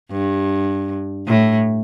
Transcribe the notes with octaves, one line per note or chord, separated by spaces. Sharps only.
G2
A2